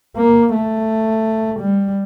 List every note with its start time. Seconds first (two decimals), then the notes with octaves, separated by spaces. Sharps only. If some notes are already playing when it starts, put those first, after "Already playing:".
0.17 A#3
0.53 A3
1.60 G3